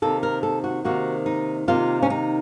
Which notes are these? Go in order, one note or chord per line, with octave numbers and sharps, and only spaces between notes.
C3 D#3 A#3 A4
A#4
A4
F#4
C3 D#3 A#3 F#4
D#4
C3 D#3 A#3 F4
C#4
D#4